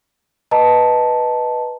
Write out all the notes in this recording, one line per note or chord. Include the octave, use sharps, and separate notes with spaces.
B4 D#5 A5 A#5